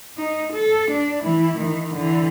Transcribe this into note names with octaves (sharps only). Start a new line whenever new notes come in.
D#4
A4
D4
E3 E4
D#3 E3
D3 E3